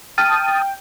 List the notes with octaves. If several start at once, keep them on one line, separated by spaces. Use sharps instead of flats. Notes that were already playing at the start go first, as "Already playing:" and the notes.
G5 A5 D#6 F6 D#7